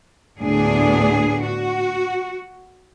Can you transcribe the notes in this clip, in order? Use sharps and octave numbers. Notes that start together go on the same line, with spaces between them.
D2 A2 B3 D4 G#4
F#4